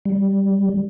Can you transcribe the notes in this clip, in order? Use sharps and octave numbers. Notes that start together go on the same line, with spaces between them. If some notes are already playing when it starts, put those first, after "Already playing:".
G3